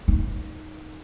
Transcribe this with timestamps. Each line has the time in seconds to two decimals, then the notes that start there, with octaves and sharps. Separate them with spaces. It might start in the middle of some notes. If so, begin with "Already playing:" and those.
0.08 D#4